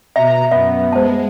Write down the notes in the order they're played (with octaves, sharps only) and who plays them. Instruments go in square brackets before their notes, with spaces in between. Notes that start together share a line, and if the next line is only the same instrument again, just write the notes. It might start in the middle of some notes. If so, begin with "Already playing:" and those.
[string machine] B2 [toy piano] E5 [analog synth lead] A#5
[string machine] F#2 [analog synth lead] B3 [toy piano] E5
[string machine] G#3 [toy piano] C5 A5